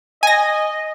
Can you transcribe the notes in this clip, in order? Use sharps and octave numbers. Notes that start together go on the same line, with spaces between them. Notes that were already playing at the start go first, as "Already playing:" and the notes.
D#5 G#5 A#6